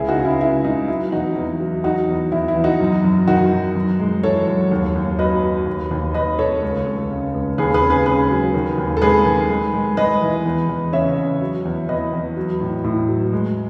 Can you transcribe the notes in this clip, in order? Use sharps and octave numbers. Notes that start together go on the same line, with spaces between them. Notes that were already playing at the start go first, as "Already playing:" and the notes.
Already playing: C#2 G#3 E4 G#4
D#4 F#4
C#3
E4
C#3 E4
G#3 D#4
F#3 E4
E2 D#4 F#4
E2
F#3
F#3 D#4 F#4
E2
E2 E4
E4
E2
D#4 F#4
F#2
F#2
D#3 D#4 F#4
F#2
F#2
G#3
E3 A4 C#5
F#2
D#2
D#2
F#3 B4 D#5
F#3
D#2
D#2
D#2 B4 D#5
D#2 A4 C#5
C#2
C#2
C#3
C#2
D#2 G#4 B4
G#4 B4
C#3
G#4 B4
C#3 G#4 B4
F#3
D#3
D#2
A4
G#3 G#4 B4
D#3
G#3
G#3
G#3 B4 D#5
E3
E2
E2
C#3 C#5 E5
C#3
F#3
E2
E2 B4 D#5
E2
F#3
A2
A2
F#3
G#3